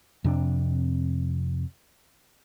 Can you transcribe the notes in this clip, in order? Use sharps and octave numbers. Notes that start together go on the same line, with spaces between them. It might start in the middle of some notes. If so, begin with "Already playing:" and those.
F2 C3 D4